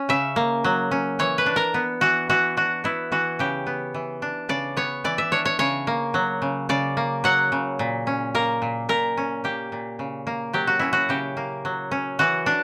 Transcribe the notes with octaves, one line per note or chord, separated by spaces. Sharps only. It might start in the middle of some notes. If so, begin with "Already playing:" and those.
Already playing: C#4
C#3 E5
A#3
F#3
C#4
E3 C#5
B4
D4
A#4
B3
E3 F#4
E3 F#4
D4 F#4
B3 E4
E3 F#4
C#3 G4
B3
E3
D4
C#3 D5
B3 C#5
E3 D5
E5
D4 C#5
C#5
C#3 C#5
A#3
F#3
C#3
C#3 D5
A#3
F#3 F#5
C#3
A#2
C#4
A#3 A#4
A#2
A#2 A#4
C#4
A#3 G4
A#2
C#3
A#3
F#3 G4
F#4
C#4 E4
F#4
C#3 G4
A#3
F#3
C#4
E3 F#4
D4